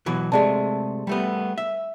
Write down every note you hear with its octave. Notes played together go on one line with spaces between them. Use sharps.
B2 E3 F#3
C3 G#3 A3 G#4 D5 A5
G3 A3 B3
E5